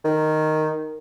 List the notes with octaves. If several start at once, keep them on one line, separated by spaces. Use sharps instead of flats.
D#3